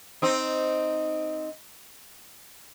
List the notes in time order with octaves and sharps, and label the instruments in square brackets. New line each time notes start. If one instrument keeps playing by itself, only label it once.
[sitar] C4 D#4